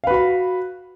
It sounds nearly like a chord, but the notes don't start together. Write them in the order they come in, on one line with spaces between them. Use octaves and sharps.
F5 B4 F#4 B5